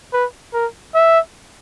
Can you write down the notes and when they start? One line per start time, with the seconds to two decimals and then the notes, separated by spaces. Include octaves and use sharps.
0.13 B4
0.54 A#4
0.95 E5